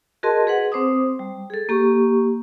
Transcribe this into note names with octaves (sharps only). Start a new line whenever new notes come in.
F#4 G#4 A#4 D#5 A5 C6
G#4 B4 F#5
C4 C5 D6 D#6
G3
G#4 A4
A#3 G4 C#6